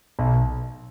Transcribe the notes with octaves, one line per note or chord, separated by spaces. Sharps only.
B1